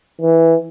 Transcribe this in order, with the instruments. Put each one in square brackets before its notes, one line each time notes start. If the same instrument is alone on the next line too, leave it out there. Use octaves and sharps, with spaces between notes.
[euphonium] E3